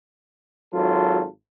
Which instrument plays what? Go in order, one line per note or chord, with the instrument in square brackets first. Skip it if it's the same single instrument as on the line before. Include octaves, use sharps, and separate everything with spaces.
[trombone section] G#1 F#3 F4 A4